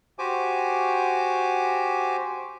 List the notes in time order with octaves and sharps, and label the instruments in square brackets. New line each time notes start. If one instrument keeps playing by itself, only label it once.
[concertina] F#4 G4 C5 G#5 D6